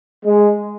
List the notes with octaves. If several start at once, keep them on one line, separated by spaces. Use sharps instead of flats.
G#3